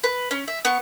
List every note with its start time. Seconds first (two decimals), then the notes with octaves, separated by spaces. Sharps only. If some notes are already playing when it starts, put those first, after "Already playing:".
0.04 B4
0.31 C#4
0.48 E5
0.65 B3 C#6